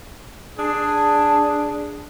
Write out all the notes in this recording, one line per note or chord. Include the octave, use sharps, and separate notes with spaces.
D4 G#4